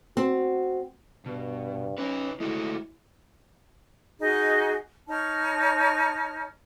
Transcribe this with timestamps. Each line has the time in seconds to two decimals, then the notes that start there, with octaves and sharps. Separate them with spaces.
0.17 C4 F#4
1.26 G2 B2
1.98 C#4 D#4 B4
2.40 G#3 A3 E4 F#4
4.20 D#4 F#4 G#4 D#5
5.07 D#4 C#5 A5 F6